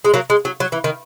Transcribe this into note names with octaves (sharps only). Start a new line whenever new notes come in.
G#3
F#3 A#3
G#3
F#3
F#3
E3
D#3